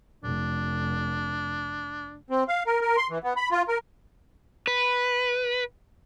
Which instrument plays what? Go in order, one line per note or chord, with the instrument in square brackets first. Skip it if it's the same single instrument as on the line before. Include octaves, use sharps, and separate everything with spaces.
[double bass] F1 [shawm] D4
[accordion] C4
F5
A#4
A#4
C6
E3
B3
B5
F4
A#4
[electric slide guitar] B4